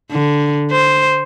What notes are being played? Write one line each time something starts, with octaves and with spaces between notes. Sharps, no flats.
D3
C5